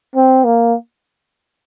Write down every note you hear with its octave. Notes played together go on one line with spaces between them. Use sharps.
C4
A#3